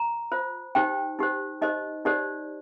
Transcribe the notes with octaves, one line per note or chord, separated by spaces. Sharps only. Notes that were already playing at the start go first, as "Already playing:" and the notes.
Already playing: A#5
F4 C5
D#4 G4 C5 G5
D#4 G4 C5
D#4 G4 C5 D#5
D#4 G4 C5 D5